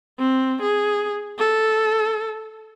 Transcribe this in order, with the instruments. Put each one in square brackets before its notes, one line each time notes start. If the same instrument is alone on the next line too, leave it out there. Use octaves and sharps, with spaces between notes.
[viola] C4
G#4
A4